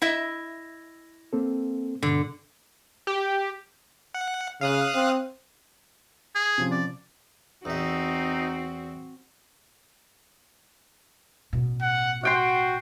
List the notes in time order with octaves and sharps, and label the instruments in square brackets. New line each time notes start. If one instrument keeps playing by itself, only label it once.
[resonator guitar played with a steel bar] E4 D#5 E5
[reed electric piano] A#3 C4 A4
[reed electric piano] G2 B2 [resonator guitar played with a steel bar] D3
[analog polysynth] G4
[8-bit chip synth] F#5
[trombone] C#3 [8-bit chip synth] F5 D#6 F#6
[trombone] C4
[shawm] G#4
[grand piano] C3 F3 C#4
[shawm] D5
[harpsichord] E2 E5 [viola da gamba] C4 F#4 [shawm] D#4
[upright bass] A1 B2
[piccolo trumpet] F#5
[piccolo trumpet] F#4 [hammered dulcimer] F#5 G5 C6